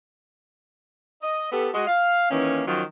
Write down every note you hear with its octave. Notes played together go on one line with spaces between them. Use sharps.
D#5
B3 G4 A4
G#3 F#4
F5
D#3 E3 A#3 C#4
D#3 F3 F#3 C#4 F4